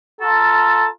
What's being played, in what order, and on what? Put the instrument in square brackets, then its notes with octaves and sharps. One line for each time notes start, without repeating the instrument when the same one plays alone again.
[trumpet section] F4 A5 A#5 [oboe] A4